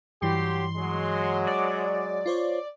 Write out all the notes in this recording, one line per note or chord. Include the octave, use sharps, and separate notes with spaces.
G2 E3 F#3 G4 C6
F#3 G#3
D5
F4 C5 C#5